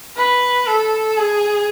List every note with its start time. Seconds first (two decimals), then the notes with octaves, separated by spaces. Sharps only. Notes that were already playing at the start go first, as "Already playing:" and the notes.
0.17 B4
0.67 A4
1.18 G#4